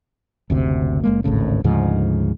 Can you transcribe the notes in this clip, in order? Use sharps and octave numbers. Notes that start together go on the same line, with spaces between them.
F#1 D2 C3
F#1 G#3 A#3
G#1 D2 A2 C#3
D2 G#2 C#3 F3